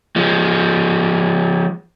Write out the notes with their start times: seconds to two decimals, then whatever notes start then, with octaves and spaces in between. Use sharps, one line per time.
0.16 F3 G#3